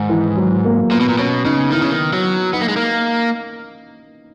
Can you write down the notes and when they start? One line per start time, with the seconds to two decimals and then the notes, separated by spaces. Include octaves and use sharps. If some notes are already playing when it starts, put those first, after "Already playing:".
Already playing: G#2 D#3
0.09 E3
0.37 F#3
0.65 A#3
0.91 A#2 B3
1.00 B2
1.09 A#2
1.18 B2 C#4
1.45 C#3 D#4
1.72 D#3 E4
1.82 C#3
1.91 D#3
2.13 F#3
2.53 B3 D#4
2.61 A#3
2.68 G#3
2.76 A#3